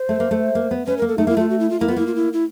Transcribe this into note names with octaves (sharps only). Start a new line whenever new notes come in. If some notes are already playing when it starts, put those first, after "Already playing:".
Already playing: C5
A3
A#3
A3
A#3
B3
C#4 B4
A#4
A#3
A4
A3 D#4
A#3 E4
A3 F4
F#4
E4
F4
A#3 E4
B3 F4
A#3 E4
F4
E4
E4